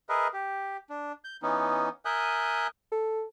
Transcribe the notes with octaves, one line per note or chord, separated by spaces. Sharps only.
G#4 A#4 B4 D#5 E5
G4
D4
G6
E3 B3 C#4 D#4
A#4 E5 G#5 D#6 F#6 G6
A4